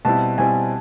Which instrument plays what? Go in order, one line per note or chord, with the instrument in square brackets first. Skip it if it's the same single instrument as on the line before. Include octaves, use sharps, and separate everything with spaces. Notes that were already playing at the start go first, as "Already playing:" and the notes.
[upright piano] B2 G3 C4 E4 [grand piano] A5
[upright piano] B2 G3 C4 E4 [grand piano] G#5